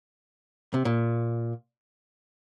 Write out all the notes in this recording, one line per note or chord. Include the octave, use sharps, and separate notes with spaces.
C3
A#2